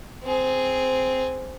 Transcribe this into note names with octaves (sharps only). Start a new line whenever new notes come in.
C4 G#4